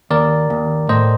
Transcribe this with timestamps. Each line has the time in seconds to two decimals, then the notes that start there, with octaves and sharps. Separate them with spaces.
0.10 D#2 A#4 D5
0.50 D#2
0.89 A2 C5 D#5